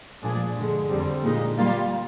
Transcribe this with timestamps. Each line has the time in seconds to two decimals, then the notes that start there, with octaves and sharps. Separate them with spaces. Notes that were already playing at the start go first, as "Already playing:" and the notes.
0.23 A#2 F3 G#3 D4 G#4
0.57 G2 D3 G#3
0.90 F2 D3 G3 C4
1.24 A#2 G#3 D#4
1.58 G3 A#3 F4